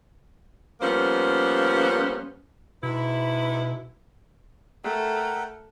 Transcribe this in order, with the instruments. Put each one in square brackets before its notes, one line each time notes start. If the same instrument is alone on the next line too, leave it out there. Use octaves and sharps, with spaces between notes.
[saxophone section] F3 G3 A#3 B3 C#4 C5
[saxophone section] G#2 B3 E4 [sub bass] B2
[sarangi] A3 [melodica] A#4 F#5 G5